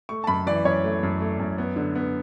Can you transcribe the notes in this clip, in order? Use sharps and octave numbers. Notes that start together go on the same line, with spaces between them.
A3 C#6
A5
F#2 B5
E3 D5
F#2 C#5
A3
F#2
A3
F#2
B3
D3
B3